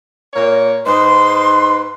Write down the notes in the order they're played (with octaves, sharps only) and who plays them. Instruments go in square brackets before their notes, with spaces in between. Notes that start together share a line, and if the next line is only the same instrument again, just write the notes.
[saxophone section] A#2 A#3 C#5
[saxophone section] G#2 B4 [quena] C6